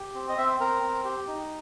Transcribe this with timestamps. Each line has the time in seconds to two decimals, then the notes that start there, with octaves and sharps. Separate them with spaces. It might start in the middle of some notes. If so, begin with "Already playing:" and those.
Already playing: G4
0.15 C4
0.29 D#5
0.38 C4 E5
0.60 C4 A#4
0.82 C4
1.05 G4
1.28 D#4